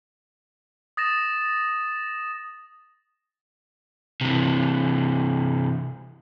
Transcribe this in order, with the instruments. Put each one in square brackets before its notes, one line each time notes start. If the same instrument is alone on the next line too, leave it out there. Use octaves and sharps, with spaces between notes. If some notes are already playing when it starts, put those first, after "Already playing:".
[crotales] D#6 A6 A#6 E7
[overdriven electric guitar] C3 E3